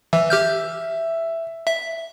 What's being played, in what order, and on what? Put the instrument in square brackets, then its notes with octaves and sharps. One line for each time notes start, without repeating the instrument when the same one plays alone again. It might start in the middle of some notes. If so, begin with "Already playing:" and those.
[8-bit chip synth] E3 [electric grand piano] E5
[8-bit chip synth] G4 F6 G6
E5